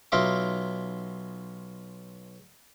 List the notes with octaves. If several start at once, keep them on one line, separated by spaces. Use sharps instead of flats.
B1 D#4 F4 E5 D6